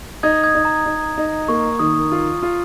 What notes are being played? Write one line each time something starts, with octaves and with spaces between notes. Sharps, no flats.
D#4 D#6 G#6
D#6 G#6
D#4
A#5
D#4
D#4
A#3 C#6
D#3 D#6
F4
F4